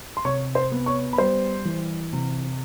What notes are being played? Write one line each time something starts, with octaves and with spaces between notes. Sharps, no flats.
C6
C3 C#5 C#6
C5 C6
B3
C#5 C#6
B5
G3 C5 C6
E3
C3